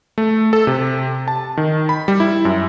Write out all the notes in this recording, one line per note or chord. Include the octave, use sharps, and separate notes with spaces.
A3
A4
C3
A5
D#3
B5
G3
E4
F#2